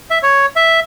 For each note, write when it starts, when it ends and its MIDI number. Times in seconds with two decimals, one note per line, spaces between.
0.10 0.18 76
0.23 0.46 73
0.56 0.80 76